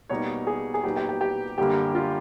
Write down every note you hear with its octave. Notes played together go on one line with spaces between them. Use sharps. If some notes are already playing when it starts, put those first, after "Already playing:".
B2 G3 A#3 D#4 C#5
G#4
G#4
A#2 F#3 B3 D#4 G4
G4
G4
G4
F#2 D3 G3 A#3 G4
F4